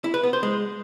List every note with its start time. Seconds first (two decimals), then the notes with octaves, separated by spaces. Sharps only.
0.04 E4
0.14 B4
0.23 B3
0.33 C5
0.43 G#3